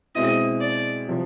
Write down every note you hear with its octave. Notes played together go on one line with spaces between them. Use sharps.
B2 G#3 C4 E4 D#5
D5
C3 F3